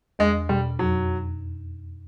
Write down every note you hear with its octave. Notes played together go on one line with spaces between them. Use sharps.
E2 G#3
B2 G3
F2 F#3